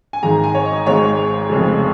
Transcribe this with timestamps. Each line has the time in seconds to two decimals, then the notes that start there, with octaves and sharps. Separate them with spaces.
0.13 G#5
0.23 G#1 G#2 D#3 G#3 A#5
0.44 G#5
0.55 C#5
0.65 D#5
0.86 G#1 G#2 D#3 G#3 C#5
1.49 F1 F2 C#3 G#3